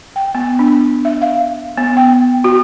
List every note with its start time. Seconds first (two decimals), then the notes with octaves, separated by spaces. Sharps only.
0.16 G5
0.35 B3
0.59 D4
1.05 E5
1.22 F5
1.77 B3
1.97 G5
2.44 F#4